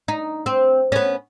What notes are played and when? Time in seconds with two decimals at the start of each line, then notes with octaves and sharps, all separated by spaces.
0.08 D#4
0.46 C4
0.92 B3 C#4